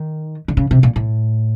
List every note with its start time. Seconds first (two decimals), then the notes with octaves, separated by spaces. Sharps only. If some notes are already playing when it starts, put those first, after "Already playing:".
Already playing: D#3
0.48 D3
0.57 C#3
0.71 C3
0.83 A#2
0.96 A2